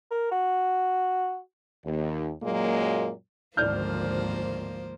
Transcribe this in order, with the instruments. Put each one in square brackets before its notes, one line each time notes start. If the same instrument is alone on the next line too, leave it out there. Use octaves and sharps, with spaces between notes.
[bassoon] A#4
F#4
[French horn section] D#2
F#2 A#2 F#3 G#3 A#3
[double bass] G#1 D2 [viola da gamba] F3 A#3 C5 [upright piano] D5 F6 G6